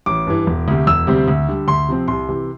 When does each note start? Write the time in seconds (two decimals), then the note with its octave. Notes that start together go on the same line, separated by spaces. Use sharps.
0.06 A1 D6
0.27 G2 E3
0.47 E1
0.68 D2 C3
0.87 E1 E6
1.07 D2 C3 G3 C4
1.28 D2
1.48 D3 G3
1.68 D2 C6
1.88 C3 F3 C4
2.08 C2 C6
2.28 C3 E3